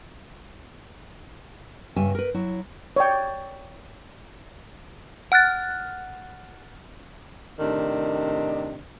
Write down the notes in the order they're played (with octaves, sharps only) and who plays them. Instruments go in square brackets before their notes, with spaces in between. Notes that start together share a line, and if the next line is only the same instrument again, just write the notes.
[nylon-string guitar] G2 C#3 G3 E5 G#5
A#4 B4
F#3 E4
[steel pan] C#5 D5 G5
[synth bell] F#5 F6 F#6 A6
[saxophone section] A2 C3 D#3 D4